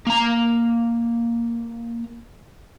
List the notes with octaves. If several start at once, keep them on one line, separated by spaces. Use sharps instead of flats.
A#3 A#5